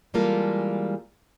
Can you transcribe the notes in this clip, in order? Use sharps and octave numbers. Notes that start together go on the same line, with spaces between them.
E3 G3 G#3 A#3 F4 A4